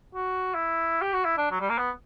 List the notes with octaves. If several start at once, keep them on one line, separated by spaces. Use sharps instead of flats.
F#4
E4
G4
F#4
E4
D4
F#3
G3
A#3
B3